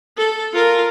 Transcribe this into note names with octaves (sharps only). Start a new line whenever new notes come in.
A4
F4 A#4